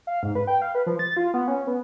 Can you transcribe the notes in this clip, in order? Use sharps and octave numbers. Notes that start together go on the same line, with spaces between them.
F5
G#2
B4
G5
F5
B4
F3
A6
F4
B3
C#4
B3